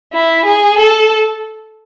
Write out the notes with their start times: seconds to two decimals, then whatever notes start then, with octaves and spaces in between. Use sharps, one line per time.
0.13 E4
0.45 G#4
0.78 A4